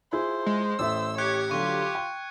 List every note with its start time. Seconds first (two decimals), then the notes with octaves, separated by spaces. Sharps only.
0.13 E4 F4 G#4 C5
0.46 G#3
0.79 A1 A2 E5 E6
1.18 G4 C#5 F#6 G#6 C#7
1.51 D3 F#3 F4 C#6
1.95 G5